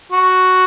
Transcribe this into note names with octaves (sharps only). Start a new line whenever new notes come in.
F#4